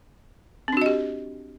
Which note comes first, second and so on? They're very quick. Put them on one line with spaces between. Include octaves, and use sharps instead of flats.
C4 D4 F#4 D#5 G4